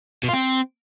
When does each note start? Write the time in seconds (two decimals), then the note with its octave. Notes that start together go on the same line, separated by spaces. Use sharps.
0.23 B2
0.28 F4
0.33 C4